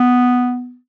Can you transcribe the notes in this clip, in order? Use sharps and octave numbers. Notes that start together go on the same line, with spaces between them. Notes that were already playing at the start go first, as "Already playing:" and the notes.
Already playing: B3